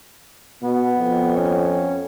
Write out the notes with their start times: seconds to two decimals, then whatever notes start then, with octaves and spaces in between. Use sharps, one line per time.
0.63 B2 B3
0.98 F2
1.36 C#4